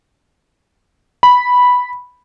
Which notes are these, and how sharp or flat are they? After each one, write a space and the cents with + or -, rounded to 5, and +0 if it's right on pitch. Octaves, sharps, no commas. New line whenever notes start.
B5 -5